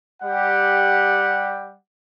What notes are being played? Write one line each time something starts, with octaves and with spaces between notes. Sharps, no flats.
G3 G4 F#5